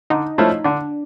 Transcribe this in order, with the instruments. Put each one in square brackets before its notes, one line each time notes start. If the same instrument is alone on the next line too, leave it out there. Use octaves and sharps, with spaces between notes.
[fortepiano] D3 [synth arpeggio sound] D#4
[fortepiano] F3 A3 C#4 E4
[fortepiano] D3 [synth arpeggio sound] D4